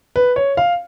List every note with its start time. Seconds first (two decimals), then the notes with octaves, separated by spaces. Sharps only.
0.16 B4
0.36 C#5
0.57 F5